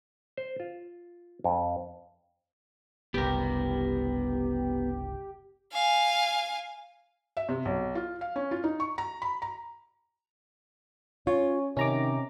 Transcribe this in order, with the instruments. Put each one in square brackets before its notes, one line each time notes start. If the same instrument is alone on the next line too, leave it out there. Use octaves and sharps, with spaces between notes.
[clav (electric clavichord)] C5
F4
F2
[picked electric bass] F#1 C2 [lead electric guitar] B3 A#4 [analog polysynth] G4
[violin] F5 G#5
[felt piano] E5
C3
B1
F4
F5
C#4
F4
D#4
C#6
A#5
B5
A#5
[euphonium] C#4 [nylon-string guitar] F4 [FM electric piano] C#5
[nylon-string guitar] C3 [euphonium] D#3 [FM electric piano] C#4 A#5 D6